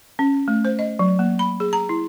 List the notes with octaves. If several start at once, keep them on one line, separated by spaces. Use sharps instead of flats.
C#4
A3
C5
D#5
F#3
A#3
B5
G#4
A#5
E4